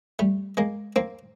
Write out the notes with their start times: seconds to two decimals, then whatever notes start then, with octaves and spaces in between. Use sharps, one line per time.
0.19 G3 A3
0.57 G#3 A#3
0.96 A#3 C4